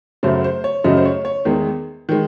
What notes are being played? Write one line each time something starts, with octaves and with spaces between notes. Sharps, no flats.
F#2 C#3 F#3 A3 C5
C5
C#5
F#2 C#3 F#3 A3 D#5
C5
C#5
C#5
E2 D#3 G#3
D#3 G#3